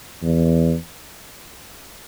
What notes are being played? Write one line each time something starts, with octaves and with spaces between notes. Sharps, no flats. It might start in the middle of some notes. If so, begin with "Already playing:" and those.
E2